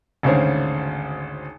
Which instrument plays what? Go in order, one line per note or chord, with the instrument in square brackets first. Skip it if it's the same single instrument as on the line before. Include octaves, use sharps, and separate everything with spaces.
[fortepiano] G#1 D2 C#3 C5 C#5